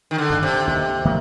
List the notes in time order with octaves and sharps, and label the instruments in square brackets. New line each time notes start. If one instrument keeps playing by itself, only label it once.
[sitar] D#3
D3
[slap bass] G2 D#3
[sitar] C3
[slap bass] D#2
D#3 A#3